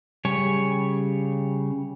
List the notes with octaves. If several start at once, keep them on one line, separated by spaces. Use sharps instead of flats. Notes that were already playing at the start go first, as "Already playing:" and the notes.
C#3 G3 C#5 G#5